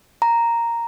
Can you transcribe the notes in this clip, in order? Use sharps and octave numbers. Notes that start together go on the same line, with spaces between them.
A#5